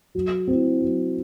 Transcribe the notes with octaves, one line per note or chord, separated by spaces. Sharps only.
F#3
C4 E4
F#3